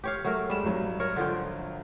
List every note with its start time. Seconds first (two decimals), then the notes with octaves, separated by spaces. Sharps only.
0.04 G4 C#5 F5
0.25 F#3 A3 A#4
0.50 G3 G#3 E7
0.64 G#1 F#3
1.00 A#4 C#5
1.16 D3 F3 G5